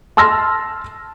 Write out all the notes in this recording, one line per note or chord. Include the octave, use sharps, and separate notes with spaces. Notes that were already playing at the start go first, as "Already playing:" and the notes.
A5 C6 E6 F6 A#6